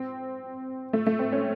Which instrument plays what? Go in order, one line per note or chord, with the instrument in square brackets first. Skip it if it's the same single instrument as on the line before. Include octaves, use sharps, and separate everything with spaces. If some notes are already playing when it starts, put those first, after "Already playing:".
Already playing: [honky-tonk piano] C4
A3
A3
C4
C#4